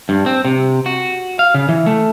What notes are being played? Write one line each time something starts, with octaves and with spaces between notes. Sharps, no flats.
G2
C4
C3
F#4
F5
C#3
E3
A3